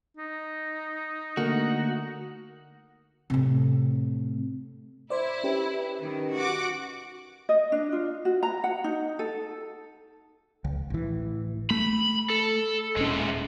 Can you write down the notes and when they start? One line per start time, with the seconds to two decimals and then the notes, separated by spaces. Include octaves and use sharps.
0.17 D#4
1.37 D3 A3 A#3 F#4 A#4
3.30 A2 C3
5.10 E4 C5 D5
5.44 C#4 G4 B4
6.01 D#3
6.36 F#4 F#5 D6
7.49 D#5
7.72 D4
7.92 F4
8.25 F#4
8.43 A#5
8.64 F#5
8.84 D#4
9.19 A4
10.64 C#2
10.90 A1 E3
11.70 A3 B5
12.30 A4
12.97 D#1 A2 G#3 C#4